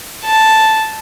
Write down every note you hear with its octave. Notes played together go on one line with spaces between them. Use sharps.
A5